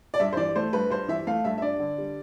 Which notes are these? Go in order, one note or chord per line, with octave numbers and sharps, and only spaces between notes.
D5
G2 E5
C5
E3 D5
A3 C5
G2 B4
G2 C5
E3 E5
A3 F5
G2 E5
E5
D4 D5
D3
G3